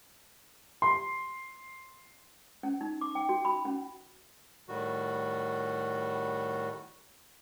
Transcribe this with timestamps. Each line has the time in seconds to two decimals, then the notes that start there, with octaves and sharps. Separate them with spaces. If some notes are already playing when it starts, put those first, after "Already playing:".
0.82 C6
2.63 C#4
2.81 D#4
3.01 D6
3.15 G5
3.29 F#4
3.45 B5
3.65 C#4
4.68 A2 D#3 G3 F#4